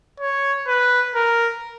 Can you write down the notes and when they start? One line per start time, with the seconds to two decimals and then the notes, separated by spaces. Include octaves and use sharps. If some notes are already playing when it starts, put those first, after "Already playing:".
0.20 C#5
0.68 B4
1.15 A#4